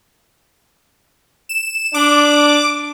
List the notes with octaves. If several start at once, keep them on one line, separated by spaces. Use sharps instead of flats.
E7
D4 D6